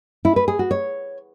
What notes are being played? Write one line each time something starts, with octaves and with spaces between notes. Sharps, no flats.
E4
B4
G#4
F#4
C#5